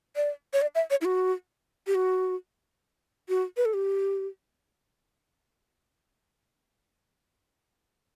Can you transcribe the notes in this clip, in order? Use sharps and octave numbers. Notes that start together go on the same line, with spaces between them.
D5
C#5
D5
E5
C#5
E4
F#4
G4
F#4
F#4
B4
A4
G4